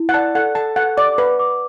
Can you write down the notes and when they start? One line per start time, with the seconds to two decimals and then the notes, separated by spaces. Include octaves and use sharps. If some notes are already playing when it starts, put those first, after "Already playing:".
Already playing: E4
0.09 F#5
0.14 D5 A5
0.35 A4 F#5
0.55 A4 A5
0.76 A4 F#5
0.97 D5 D6
1.18 B4 F#5
1.39 D6